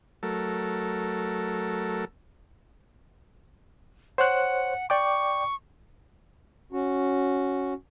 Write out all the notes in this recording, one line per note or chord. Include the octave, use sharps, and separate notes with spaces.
F#3 A3 A4 A#4
C5 C#5 F#5 F#6
D5 G5 C#6 D6
C#4 F#4